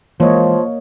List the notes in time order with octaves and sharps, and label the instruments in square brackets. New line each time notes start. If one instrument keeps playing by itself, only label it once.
[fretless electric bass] E3 G#3 [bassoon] F3 [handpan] A#3 C#5 D#5